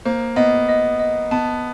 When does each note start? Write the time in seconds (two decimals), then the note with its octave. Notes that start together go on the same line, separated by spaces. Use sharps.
0.05 A#3 C5
0.36 B3 D#5
0.69 D#5
1.00 D#5
1.31 B3 A5